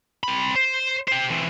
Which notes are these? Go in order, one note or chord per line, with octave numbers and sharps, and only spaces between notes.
C4 B5
C5
G4 C5
E3 C4